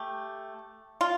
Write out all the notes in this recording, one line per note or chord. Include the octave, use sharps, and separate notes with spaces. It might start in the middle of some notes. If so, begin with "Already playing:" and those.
Already playing: A3 G4
F4